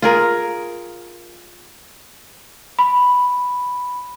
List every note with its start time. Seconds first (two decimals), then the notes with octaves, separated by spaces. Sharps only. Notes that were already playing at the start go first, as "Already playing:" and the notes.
0.02 F4 G#4 A#4
2.79 B5